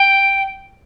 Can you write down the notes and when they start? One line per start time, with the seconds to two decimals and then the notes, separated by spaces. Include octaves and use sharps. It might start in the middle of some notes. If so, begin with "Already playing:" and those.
Already playing: G5